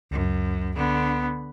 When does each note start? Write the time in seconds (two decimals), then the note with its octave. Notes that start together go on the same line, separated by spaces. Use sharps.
0.11 C#2 F#2
0.76 D3 B3